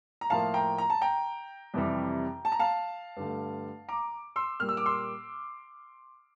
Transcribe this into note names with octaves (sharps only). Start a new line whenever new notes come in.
A#5
A2 F3 A#3 F5 A5
G5 A#5
A#5
A5
G5 A#5
F2 C3 E3 G3
A5
A#5
F5 A5
G2 D3 A3
A#5 D6
C6 E6
A#2 G3 A#3 F6
E6
D6
C6 E6